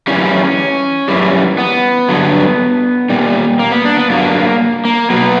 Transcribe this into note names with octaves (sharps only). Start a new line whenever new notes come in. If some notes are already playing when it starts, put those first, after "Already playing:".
F#2 E3 G3 C#4
F#2 E3 G3
B3
G2 D3 F#3
A#2 G3
A#3
B3
D4
B3
G2 F#3 A#3
A#3
B2 F#3 B3